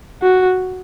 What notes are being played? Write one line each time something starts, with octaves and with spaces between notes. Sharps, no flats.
F#4